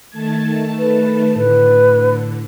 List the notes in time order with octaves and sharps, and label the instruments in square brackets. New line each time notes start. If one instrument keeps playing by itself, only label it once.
[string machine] D#3 A3 A5 [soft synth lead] G#6
[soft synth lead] B4
[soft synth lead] A2 [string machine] D3 [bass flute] B4